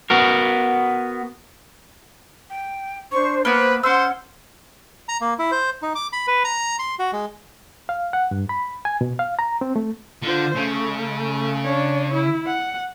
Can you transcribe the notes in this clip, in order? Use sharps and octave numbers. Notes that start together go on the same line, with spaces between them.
B3 F#4 A#4
G5
D4 C5 C#6
A#3 B3 B4 C5 B5
C#4 C5 F#5 C6 E6
A#5
A#3
E4
C5
D#4
D6
B5
B4
A#5
C6
F#4
G#3
F5
F#5
G2
B5
G#5
B2
F5
A#5
C4
A3
D3 F4 C5
C#3 A3
D4 C#5
E4
F#5